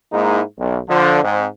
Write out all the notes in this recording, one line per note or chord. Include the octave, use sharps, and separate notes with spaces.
G#2 G#3 A#3 D#4 E4
B1
D3 F3
G#2 C4